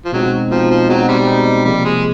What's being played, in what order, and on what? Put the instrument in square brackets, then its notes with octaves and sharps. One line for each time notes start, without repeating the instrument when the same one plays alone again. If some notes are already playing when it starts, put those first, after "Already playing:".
[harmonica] F3
[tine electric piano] B2 G#3 C4 D#4 [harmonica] F#3
[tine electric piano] B2 G#3 C4 D#4 [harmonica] F3
[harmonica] F3
[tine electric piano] B2 G#3 C4 D#4 [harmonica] F#3
[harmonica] C3 G3
[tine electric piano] B2 G#3 C4 D#4
[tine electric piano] C3 F3 A#3 [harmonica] G3
[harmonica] G#3